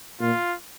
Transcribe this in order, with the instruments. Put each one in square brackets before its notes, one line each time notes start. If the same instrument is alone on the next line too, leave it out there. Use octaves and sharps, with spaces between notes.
[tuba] A#2 [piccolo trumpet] F4